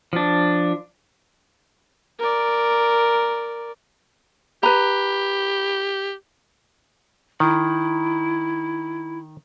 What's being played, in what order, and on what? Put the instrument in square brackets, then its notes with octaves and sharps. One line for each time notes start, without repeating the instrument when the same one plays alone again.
[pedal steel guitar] F3 D4
[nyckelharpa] A#4 D5
[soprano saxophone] G4 [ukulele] B4 A#5 [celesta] B5
[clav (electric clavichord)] D#3 [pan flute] E4